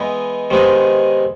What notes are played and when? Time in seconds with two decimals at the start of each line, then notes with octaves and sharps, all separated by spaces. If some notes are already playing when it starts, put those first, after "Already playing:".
Already playing: E3 G#3 B3 D#4
0.50 C3 D#3 G#3 B3 D#4